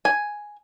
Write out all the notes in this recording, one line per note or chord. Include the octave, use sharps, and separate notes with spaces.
G#5